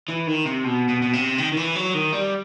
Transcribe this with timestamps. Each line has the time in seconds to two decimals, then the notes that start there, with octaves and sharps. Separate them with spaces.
0.08 E3
0.27 D#3
0.45 C3
0.64 B2
0.88 B2
1.02 B2
1.13 C3
1.38 D#3
1.52 D#3
1.57 E3
1.75 F#3
1.94 D#3
2.13 G3